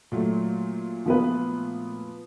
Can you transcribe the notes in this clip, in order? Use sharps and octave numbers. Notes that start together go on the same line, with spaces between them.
A#2 F#3 A3
F3 B3 B4